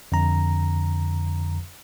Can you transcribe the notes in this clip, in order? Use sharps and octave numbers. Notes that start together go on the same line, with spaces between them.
F2 D3 A#5